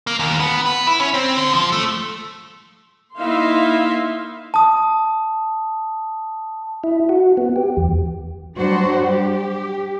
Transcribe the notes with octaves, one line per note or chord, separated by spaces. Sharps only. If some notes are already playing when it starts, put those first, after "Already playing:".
A#3
D#2
B3
B4
E4
C#4
C4
D3
F3
A3
A#3 D#4 E4 E5 F5 C6
A5 D#6
E4
F#4
B3
G4
E2
G2 F#3 G3 D4 F#4 C5
G4